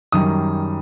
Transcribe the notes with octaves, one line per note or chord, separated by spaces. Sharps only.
F#2 D#3 G3 D#6